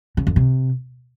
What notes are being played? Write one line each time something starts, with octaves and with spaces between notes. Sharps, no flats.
C#3
F2
C3